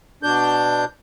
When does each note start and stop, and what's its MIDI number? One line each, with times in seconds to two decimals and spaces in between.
0.23 0.85 47
0.23 0.85 62
0.23 0.85 91